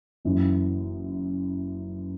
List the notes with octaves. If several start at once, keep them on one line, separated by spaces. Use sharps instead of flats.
F#1 F#2 E3